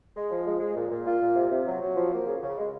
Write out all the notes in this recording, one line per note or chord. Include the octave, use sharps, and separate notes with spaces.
G#3
F3
G#3
G#3
A#2
A#2
F4
A#2
C3
C3
F#3
F#3
F3
A#3
C#3
C#3
G#3